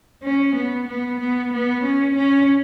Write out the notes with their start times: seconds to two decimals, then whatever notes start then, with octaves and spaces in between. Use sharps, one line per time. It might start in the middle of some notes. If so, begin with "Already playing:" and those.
0.22 C#4
0.55 B3
0.87 B3
1.19 B3
1.52 B3
1.84 C#4
2.16 C#4